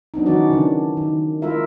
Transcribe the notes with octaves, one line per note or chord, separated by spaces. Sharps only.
F#3 B3 D4 D#4
D#3 E3 F#3 C#4 F#4 D5
C#3 E3 D4
D#3
G#3 E4 F4 A#4 E5